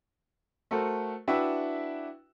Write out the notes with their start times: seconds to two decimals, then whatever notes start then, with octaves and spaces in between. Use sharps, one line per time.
0.71 A3 F#4 A4 A#4 C5
1.28 D4 E4 F#4 B4 E5 G5